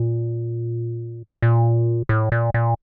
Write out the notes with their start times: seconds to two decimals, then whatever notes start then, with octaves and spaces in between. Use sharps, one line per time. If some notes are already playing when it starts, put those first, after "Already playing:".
Already playing: A#2
1.42 A#2
2.09 A2
2.32 A#2
2.54 A#2